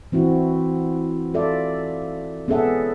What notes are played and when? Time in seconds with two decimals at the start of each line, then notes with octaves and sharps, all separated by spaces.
0.12 E3 C4 E4 F#4
1.34 F4 A4 D5 E5
2.48 B3 C#4 G#4 A4 E5 F#5